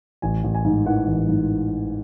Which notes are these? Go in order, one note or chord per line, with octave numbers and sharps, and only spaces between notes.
A1 G#5
A1
G#5
G#2
E3 F#5
A1
G#2